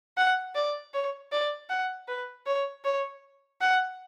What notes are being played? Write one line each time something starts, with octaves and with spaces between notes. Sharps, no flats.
F#5
D5
C#5
D5
F#5
B4
C#5
C#5
F#5